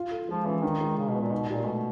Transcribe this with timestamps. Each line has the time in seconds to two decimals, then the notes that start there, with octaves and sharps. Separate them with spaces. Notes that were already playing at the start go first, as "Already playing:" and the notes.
Already playing: F4
0.11 A4
0.29 F3 G#3
0.46 E3 C#4
0.63 D#3 D4
0.81 G#3
0.97 C#3 G#3
1.09 B2
1.15 B3
1.21 A#2
1.31 B2 D#4
1.49 A#2 G4
1.66 B2 A3